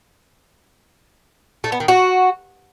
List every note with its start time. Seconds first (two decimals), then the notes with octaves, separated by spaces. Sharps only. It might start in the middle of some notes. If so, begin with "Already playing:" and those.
1.64 A3
1.72 B3
1.80 D#3
1.88 F#4